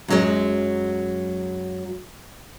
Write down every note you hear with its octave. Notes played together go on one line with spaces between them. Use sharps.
F#2 F#3 G#3